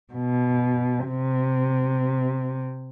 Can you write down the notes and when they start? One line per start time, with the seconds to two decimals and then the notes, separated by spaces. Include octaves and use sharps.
0.13 B2
1.08 C3